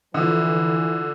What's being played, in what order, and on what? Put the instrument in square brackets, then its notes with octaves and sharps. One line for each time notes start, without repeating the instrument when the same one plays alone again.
[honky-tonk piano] D3 F3 [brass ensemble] E3